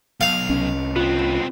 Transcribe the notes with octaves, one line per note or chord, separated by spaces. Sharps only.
B1 F5
C2 C#4
B3 C4 F4